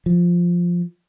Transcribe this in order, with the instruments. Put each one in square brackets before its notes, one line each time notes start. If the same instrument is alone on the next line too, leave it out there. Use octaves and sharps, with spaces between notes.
[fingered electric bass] F3